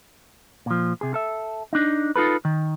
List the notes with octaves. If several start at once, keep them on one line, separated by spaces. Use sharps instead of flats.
A#2 F3
C3 G#4
A4 E5
D4 D#4
D#4 F4 A4 B4
D#3